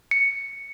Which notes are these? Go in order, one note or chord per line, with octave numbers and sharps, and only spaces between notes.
C#7